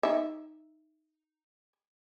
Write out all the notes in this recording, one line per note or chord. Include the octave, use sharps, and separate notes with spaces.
D#4 E5